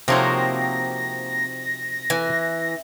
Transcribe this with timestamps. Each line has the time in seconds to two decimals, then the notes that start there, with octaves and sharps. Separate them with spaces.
0.08 C3 F3 A#3 C4 D#4 F#4 C#5 A#6
2.10 E3 G#5